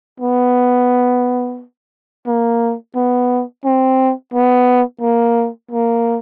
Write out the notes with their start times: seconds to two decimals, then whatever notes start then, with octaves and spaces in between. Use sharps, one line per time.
0.20 B3
2.27 A#3
2.95 B3
3.65 C4
4.34 B3
5.01 A#3
5.71 A#3